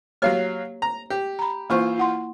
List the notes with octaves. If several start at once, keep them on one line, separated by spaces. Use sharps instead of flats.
F#3 A#3 G4 C#5 F5 F6
A#5
G4
A#5 B5
E3 A#3 F4 C5 C#6
E4 F#5 C6